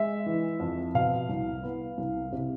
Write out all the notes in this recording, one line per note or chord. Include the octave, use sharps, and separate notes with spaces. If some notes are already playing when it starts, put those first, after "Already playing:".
Already playing: G#3 E5
E3
F2
B2 F5
C2
B3
C2
C3